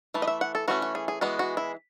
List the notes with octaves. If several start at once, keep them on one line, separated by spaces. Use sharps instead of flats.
E3 A3
D#5
E5
F#5
A4
E3 A3 C#4 F#4
F#4
G#4
G#4
E3 G#3 B3 F#4
F#4
E4